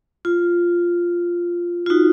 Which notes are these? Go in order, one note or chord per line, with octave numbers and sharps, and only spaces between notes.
F4
F4
D#4 F#4